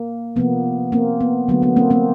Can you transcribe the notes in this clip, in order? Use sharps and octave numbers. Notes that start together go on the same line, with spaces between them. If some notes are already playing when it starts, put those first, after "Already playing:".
Already playing: A#3
C3 F3 A#3 B3
A#3 C4
B3
D3 F#3 A3 B3
B3
A#3 C4
A#3 C4